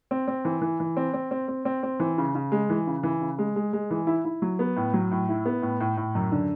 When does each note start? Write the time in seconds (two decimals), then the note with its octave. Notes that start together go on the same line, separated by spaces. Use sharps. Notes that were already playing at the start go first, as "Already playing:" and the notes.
0.11 C4
0.28 C4
0.45 E3
0.62 E3
0.80 E3
0.97 C4
1.14 C4
1.31 C4
1.48 C4
1.65 C4
1.83 C4
2.00 E3
2.18 C#3
2.35 C#3
2.52 G#3
2.70 E3
2.87 C#3
3.03 E3
3.21 C#3
3.39 G#3
3.56 G#3
3.73 G#3
3.91 E3
4.07 E4
4.25 E4
4.42 F#3
4.59 B3
4.77 A2
4.94 F#3
5.12 A2
5.29 E4
5.46 B3
5.62 A2
5.80 A2
5.97 A2
6.15 F#2
6.32 D3